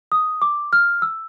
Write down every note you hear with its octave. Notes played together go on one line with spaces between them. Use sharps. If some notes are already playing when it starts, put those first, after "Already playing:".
D#6
D6
F6
E6